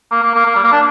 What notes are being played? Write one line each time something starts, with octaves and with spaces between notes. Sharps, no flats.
A#3
A#3
A#3
A#3
G3
A#3
D4